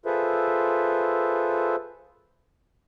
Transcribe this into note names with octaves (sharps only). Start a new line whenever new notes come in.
F4 G#4 A4 B4 C5 E5